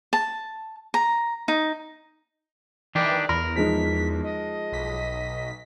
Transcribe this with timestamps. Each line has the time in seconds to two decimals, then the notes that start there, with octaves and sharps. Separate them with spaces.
0.13 A5
0.94 A#5
1.48 D#4
2.95 D#3 E3 D4 G4 D5
3.29 E2 A#4 B5
3.56 F3 G#3 D#4 B6
4.24 D#5
4.72 B1 B6